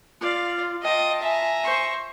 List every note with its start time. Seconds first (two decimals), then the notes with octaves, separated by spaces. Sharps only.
0.21 F4 D5 F5
0.83 F4 D#5 G5 A5
1.23 E5 G#5 A#5
1.63 C5 C#6